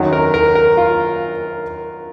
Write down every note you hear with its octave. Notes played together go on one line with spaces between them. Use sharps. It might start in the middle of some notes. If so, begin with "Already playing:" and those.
Already playing: F#2 D#3 F#3
A#4
A#4
A#4
F4